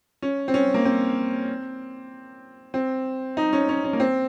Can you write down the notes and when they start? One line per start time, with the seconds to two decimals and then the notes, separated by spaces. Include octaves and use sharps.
0.22 C#4
0.48 C4
0.54 C#4
0.74 A#3
0.85 C4
2.74 C4
3.37 D#4
3.53 C#4
3.69 C#4
3.84 C#4
3.93 A#3
4.00 C4